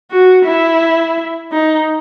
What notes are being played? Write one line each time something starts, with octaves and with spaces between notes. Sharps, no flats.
F#4
E4
D#4